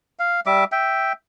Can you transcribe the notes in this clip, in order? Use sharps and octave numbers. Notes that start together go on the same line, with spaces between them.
F5
G3 E5 D6
E5 G5